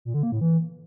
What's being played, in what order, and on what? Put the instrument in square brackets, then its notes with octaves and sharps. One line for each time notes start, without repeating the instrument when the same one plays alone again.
[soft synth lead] A#2
D3
A#3
A2
E3